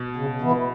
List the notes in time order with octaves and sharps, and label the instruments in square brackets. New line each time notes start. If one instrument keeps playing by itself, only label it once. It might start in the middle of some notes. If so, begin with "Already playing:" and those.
Already playing: [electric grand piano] B2
[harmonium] C#3
E3 B3 E4